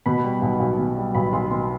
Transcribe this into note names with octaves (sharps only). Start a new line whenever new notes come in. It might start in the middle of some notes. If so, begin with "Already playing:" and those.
B2 B5
G3
B1
B1
B2
G3
B1 B5
B1 C6
B2 C6